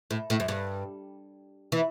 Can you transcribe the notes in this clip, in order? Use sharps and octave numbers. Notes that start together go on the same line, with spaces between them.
A2
A2
F#2
G2
E3